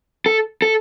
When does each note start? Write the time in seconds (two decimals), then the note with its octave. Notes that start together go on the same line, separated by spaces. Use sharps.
0.26 A4
0.62 A4